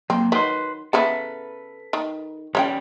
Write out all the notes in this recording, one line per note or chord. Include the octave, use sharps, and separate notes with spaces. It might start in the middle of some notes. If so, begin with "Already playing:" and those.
F#3 A#3 C4
D#3 F#3 B4 C6
C#3 B3 E4 A4 B4
D#3
G3 C#4 C#5 E5 G5